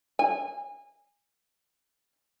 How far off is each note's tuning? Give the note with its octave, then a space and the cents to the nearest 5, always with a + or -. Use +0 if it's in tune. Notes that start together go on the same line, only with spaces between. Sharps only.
G#5 -25